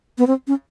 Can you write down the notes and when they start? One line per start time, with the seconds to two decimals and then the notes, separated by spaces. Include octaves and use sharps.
0.18 B3
0.27 C4
0.48 C#4